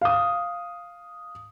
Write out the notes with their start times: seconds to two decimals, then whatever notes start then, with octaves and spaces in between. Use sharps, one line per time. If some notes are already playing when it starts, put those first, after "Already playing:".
0.01 F5 D#6